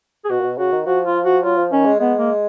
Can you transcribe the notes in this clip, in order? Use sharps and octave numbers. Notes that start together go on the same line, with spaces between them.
G#4
B2 F#4
A#2
B2
C#3 F#4
D#3
F3 F#4
F4
F#4
F#3 F4
F3
D#3 C#4
G#3
G#3 B3
A#3